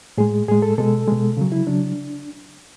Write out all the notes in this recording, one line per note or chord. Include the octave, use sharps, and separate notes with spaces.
A2 G#3 G#4
A2 G#3 G#4
A4
B2 G#3 A4
B2 G#3
C#3 F#3
E4
C#3 F#3 D4